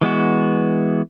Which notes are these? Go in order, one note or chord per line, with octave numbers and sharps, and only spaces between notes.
E3 G#3 B3 F#4